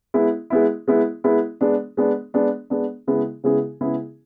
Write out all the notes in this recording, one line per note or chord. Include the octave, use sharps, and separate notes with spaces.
G#3 B3 E4
G#3 B3 E4
G#3 B3 E4
G#3 B3 E4
G#3 B3 D4
G#3 B3 D4
G#3 B3 D4
G#3 B3 D4
C#3 G#3 B3 E4 G#4
C#3 G#3 B3 E4 G#4
C#3 G#3 B3 E4 G#4